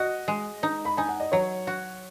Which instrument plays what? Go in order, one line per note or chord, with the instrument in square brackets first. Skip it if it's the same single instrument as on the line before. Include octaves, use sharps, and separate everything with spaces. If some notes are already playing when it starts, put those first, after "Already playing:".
Already playing: [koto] F#4 [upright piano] D#5
[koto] G#3
D#4
[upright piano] B5
[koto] D#4 [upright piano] G#5
[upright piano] F#5
D#5
[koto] F#3 [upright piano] C#5
[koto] F#4